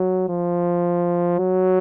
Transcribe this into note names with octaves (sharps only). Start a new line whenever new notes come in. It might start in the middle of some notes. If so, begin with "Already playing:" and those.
Already playing: F#3
F3
F#3